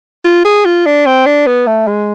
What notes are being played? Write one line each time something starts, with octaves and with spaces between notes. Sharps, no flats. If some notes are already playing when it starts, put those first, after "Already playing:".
F4
G#4
F4
D4
C4
D4
B3
A3
G#3